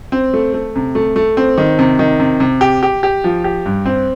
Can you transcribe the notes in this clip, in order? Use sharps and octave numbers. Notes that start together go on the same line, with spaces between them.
C4
A3
A3
C3
A3
A3
C4
D#3
C3
D#3
C3
C3
G4
G4
G4
F3
G4
G2
C4